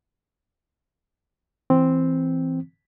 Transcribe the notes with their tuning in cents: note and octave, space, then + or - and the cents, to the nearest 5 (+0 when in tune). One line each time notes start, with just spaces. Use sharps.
E3 +0 C4 +0